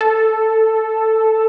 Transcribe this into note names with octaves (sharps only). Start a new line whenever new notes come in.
A4